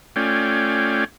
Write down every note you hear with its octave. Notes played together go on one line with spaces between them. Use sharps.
A3 C#4 F4 D5 G5 G#5